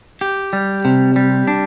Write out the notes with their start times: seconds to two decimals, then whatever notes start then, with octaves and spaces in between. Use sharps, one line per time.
0.21 G4
0.53 G3
0.85 C3
1.16 G3
1.47 D4